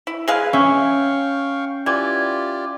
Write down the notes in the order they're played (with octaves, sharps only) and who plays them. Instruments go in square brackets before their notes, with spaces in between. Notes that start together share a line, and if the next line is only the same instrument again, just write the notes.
[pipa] E4
[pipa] G#3 G#4 F5 [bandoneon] B4 G#5
[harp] C#4 [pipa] E5 [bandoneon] F5 G5 C#6
[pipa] E3 [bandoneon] F4 G4 D5 [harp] G#6